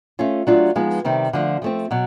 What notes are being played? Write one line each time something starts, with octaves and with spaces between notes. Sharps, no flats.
A3 C#4 F4
F#3 A3 D4 F4
F3 G#3 B3 D#4
C3 D#3 G3 C4
D3 F3 A3
F3 A3 C4
B2 F#3